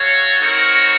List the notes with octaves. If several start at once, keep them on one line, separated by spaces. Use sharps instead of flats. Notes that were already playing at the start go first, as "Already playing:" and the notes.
Already playing: F#4 A4 C#5 F5
C4 D#4 F#4 A#4 C#5